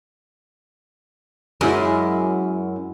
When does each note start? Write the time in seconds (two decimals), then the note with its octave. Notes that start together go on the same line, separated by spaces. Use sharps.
1.61 F#2 G#3 E4